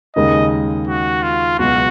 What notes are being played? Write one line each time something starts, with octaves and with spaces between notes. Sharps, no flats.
D#2 C#3 G#3 D#4 A#4 D#5
F#4
F4
C#2 B2 F#3 F#4